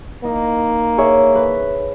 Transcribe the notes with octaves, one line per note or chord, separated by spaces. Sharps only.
A#3 D#4
G#4 C#5 E5
B4